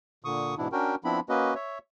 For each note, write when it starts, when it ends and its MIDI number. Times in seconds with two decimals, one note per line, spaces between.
0.25 0.55 46
0.25 0.55 50
0.25 0.55 85
0.25 0.55 87
0.58 0.68 44
0.58 0.68 47
0.58 0.68 52
0.58 0.68 59
0.58 0.68 62
0.58 0.68 64
0.72 0.95 61
0.72 0.95 62
0.72 0.95 66
0.72 0.95 70
0.72 0.95 79
1.04 1.20 53
1.04 1.20 59
1.04 1.20 60
1.04 1.20 62
1.04 1.20 64
1.04 1.20 83
1.29 1.54 58
1.29 1.54 61
1.29 1.54 66
1.29 1.54 71
1.29 1.54 75
1.55 1.78 73
1.55 1.78 76